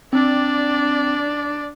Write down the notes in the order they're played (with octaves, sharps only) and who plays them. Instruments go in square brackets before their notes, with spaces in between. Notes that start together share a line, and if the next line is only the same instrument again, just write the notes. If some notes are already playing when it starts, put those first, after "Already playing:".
[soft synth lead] C4 [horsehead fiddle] D4 D5